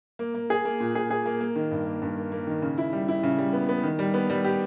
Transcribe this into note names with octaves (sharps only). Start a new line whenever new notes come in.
A#3
A#3
G#4
A#3
A#2
G#4
G#4
A#3
A#3
D#3
G2
A#3
G2
A#3
A#3
D#3
C#3
E4
G3
E4
C#3
G3
B3
B3
D#3
G3
B3
G3
G4